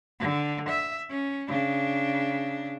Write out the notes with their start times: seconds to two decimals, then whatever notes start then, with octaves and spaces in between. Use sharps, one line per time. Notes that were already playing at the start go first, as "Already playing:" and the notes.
0.20 D3
0.69 E5
1.11 C#4
1.48 C#3 D4